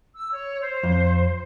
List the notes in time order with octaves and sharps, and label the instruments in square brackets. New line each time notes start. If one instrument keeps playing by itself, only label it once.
[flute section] E6
C#5
C5
[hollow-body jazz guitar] F2